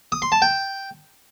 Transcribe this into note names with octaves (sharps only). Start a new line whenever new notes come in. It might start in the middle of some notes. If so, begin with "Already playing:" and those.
D#6
C6
A5
G5